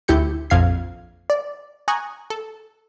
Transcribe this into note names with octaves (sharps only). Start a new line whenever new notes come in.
D2 E4 G4 G6 C#7
A#1 F2 F5 G#6 C7
D5
G#5 A#5 C#6 D#6 F#6 G#6
A4